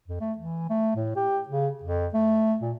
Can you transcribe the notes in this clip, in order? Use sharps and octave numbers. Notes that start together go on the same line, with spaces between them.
F2
A3
E3
A3
A2
G4
C#3
F2
A3
A#2